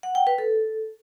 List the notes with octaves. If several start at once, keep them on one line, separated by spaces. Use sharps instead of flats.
F#5
G5
B4
A4